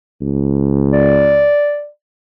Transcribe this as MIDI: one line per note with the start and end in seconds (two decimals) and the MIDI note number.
0.22 1.51 37
0.93 1.88 74